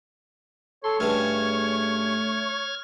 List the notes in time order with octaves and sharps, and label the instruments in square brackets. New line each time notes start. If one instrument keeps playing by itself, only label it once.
[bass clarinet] A4 [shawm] C#5 [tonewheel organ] C6
[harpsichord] G2 C#3 [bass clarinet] A3 [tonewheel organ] F6 G#6